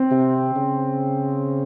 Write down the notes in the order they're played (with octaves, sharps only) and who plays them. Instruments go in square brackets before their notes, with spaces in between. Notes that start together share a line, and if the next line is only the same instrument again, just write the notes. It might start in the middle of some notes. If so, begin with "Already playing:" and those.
Already playing: [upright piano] C4
[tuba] C3
C#3